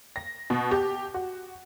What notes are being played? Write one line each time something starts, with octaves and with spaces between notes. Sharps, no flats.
A#6
B2
G4
F#4